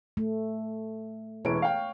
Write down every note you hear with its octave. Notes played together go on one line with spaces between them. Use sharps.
A3
E1 E3 C#5 D7
F5 G5